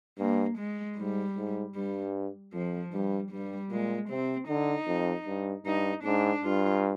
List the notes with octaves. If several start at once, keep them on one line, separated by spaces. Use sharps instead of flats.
G2 A#3
G#3
G#2 G3
G#2
G2 G3
F2 F3
G2 G3
G2 G3
A#2 G#3
C3 C4
D3 D#4
F2
G2
G2 D#4
G#2 D4
G2 F4